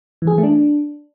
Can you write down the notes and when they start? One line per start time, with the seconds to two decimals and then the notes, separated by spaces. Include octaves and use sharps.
0.22 E3
0.27 G#4
0.33 E3
0.38 A3
0.43 D4